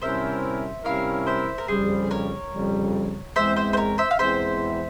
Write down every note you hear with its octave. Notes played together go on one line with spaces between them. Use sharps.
C3 G3 C#4 E4 A#4 C5 E5
C3 G3 C#4 E4 A#4 C#5 F5
C5 E5
A#4
F2 C#3 G3 G#4 C5
A#4 C#5
F2 C#3 G3
E2 E3 G#3 C4 C5 E5
C5 E5
C5
A#4 C#5
C5 E5
F5
E2 E3 G#3 C4 C5 E5